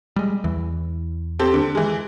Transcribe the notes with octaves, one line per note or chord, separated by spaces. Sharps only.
G3 G#3
E2 E3
C4 G4 A4
D3
E3 G#3